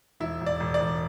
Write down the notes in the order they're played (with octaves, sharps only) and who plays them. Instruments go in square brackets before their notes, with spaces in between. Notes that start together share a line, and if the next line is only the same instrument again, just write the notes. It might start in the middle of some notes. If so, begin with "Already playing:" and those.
[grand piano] E1 E4
E1
D5
E1
D5
E1